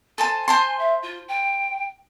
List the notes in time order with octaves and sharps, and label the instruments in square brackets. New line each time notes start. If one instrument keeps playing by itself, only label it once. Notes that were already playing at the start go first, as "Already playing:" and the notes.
[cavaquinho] A4 C5 A5 [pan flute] G#5
[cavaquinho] C5 A5 C6
[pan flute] E5
F4
G5